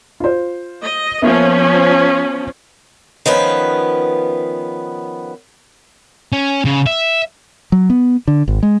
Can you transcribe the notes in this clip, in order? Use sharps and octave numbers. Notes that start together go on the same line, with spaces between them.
F4 C5
D#5
F3 A#3 B3 C#4 E5
D#3 F3 B3 C#4 B4
C#4
C#3
E5
F#3
B3
D3
G#1
G#3